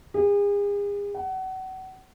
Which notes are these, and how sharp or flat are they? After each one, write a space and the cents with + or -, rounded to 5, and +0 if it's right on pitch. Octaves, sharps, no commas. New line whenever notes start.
G#4 -40
F#5 +30